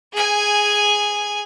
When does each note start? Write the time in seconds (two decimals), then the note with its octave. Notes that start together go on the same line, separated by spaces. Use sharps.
0.13 G#4 G#5